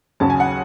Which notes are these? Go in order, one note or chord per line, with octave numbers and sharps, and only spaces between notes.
D#2 C#3 F#3 C#4 A5
G#5
F#5